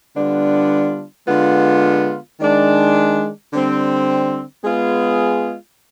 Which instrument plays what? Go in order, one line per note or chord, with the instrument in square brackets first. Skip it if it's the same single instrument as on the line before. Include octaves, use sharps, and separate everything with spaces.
[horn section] D3 G3 B3 D4 F4
D3 G#3 B3 F4
D#3 G#3 D4
D3 G3 C4
G#3 B3 F4 G#4